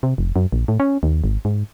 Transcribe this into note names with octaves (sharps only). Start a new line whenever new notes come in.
C3
F1
F#2
A#1
A2
C#4
D#2
G#1
G#2